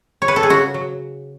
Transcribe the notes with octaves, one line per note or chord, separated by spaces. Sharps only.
C#5
B4
A4
G#4
C#3 F#4
F#3